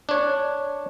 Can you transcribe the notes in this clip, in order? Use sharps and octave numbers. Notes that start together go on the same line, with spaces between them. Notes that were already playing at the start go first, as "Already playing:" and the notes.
D4 C#5